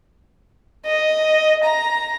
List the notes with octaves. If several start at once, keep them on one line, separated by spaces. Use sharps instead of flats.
D#5
A#5